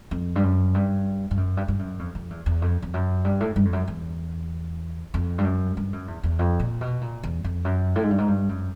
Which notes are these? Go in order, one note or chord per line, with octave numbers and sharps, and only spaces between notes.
F2
G2
F#2
G2
G2
F#2
G2
G2
F#2
F2
F2
E2
E2
F2
F2
F#2
G2
A2
G2
F2
F#2
E2
F2
G2
F#2
G2
F#2
E2
E2
F2
A#2
B2
A#2
E2
F2
F#2
A2
G#2
G2
G#2
G2
F#2